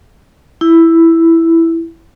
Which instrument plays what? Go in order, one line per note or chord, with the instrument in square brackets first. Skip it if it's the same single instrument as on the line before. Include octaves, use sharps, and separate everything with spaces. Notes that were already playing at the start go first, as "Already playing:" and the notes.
[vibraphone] E4